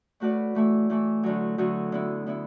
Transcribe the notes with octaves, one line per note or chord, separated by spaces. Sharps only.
A2 A3 F#4 B4 D5
E3 A3 E4
E3 A3 E4
D2 D3 F#3
D2 D3 F#3
D3 B3 E4
D3 B3 E4